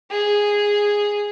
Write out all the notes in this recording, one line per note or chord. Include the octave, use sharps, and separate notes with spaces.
G#4